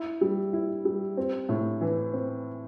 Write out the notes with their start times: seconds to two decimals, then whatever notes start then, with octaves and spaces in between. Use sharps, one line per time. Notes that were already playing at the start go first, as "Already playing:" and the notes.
Already playing: E4
0.21 G3
0.53 E4
0.85 G3
1.17 C4
1.49 A2
1.81 E3
2.13 C4